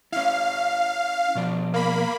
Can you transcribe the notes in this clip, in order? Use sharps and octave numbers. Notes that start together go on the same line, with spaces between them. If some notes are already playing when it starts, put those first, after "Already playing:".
C#4 E4 F5
B2 F3 D5
A#3 B5